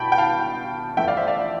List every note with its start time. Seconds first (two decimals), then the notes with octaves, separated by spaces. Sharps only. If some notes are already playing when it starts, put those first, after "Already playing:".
Already playing: B2 G5 A5 B5
0.12 G5
0.18 F5 A5
0.97 F2 E3 A3 E5 G5
1.07 D5 F5
1.17 C5 E5
1.27 D5 F5